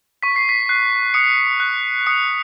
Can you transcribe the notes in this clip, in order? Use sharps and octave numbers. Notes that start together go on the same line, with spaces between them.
C#6 B6
C7
B6
F#6 C7
D#6 C#7
F#6
D#6 C#7